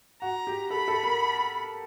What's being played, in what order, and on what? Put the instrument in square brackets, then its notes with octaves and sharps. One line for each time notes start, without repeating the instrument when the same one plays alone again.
[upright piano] F#4 [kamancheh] A#5
[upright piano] G4
[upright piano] A4 [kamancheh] B5
[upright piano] A4
A#4